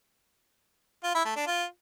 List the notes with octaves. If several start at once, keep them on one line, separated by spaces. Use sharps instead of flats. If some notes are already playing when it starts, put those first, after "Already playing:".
F4
E4
A3
D4
F4